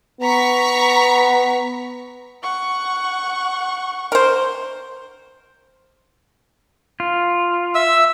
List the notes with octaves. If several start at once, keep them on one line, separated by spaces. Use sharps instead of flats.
B3 A#5 C#6 B6
F#5 C#6
A#4 C5
F4
E5 E6